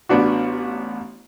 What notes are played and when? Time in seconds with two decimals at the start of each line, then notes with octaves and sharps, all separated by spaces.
0.09 A1 B3 D4 F#4